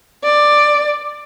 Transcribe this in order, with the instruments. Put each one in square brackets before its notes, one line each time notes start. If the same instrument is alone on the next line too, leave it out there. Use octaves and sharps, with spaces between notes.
[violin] D5